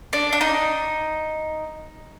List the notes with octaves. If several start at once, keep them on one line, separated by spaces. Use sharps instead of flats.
D4
D4
D#4